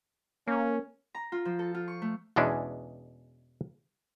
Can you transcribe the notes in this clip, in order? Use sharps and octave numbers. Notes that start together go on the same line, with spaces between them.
A#3 C#4
A#5
F4
F3
A4
F4
C#6
A3
E2 B2 E3 G#3 C#4 D4